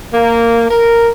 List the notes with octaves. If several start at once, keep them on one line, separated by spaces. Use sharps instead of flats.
A#3
A#4